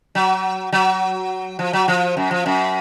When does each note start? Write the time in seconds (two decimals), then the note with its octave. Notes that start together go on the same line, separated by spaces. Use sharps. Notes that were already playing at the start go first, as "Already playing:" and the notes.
0.15 F#3
0.72 F#3
1.59 F3
1.73 F#3
1.88 F3
2.17 F#2
2.31 F3
2.46 F#2